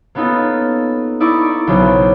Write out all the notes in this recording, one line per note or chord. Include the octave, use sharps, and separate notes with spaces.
A#3 B3 C#4 D#4 F4 A4
D#4 E4 D5 C#6
B1 C#3 F#3 C#4 C5